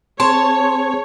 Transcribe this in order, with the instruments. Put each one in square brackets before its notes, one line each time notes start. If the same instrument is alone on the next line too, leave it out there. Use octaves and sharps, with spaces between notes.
[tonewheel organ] C4 G#4 [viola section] C#5 [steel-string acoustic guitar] A5 [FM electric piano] C6